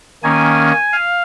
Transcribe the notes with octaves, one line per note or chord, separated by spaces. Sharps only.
D#3 A#3 C#4 G#5
F5